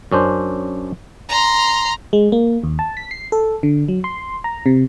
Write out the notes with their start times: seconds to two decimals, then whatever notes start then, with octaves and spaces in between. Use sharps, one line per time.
0.12 F#2 C#4 D4 C5
1.29 A#5 C6
2.13 G#3
2.32 A#3
2.64 D#2
2.79 A5
2.97 B6
3.11 C7
3.32 A4
3.63 D3
3.88 F#3
4.04 C6
4.44 A#5
4.66 C3